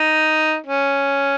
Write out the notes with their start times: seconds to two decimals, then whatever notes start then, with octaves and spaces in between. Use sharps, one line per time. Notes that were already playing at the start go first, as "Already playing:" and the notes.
Already playing: D#4
0.66 C#4